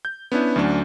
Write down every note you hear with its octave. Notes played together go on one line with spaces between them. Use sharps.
G6
B3 C#4 D4 E4
D2 F#3 C#4 D4